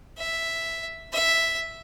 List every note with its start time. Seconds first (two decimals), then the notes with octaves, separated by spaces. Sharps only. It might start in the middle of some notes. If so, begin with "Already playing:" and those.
0.18 E5
1.12 E5